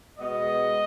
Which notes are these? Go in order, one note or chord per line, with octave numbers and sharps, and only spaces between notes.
B2 G#3 B3 D#5